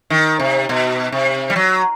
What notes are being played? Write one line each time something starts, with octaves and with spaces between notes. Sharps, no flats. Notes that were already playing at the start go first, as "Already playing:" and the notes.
D#3
C3
B2
C3
G3
F#3